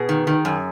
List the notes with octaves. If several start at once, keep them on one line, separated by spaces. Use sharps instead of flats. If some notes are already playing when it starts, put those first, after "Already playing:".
Already playing: B2 G#4
D#3
D#3
F#2